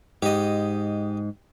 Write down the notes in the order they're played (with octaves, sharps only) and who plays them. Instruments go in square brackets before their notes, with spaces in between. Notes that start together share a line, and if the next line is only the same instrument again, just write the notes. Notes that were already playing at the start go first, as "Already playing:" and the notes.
[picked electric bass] G#2 [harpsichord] G4 D#5